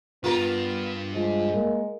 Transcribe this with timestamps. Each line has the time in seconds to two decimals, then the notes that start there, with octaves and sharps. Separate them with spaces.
0.24 G2 B3 F4 A#4
1.14 F3 G#3
1.53 A#3